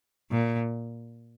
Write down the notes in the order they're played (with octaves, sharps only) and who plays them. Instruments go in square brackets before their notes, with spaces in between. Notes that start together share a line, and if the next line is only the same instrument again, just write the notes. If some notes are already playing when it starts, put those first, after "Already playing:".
[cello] A#2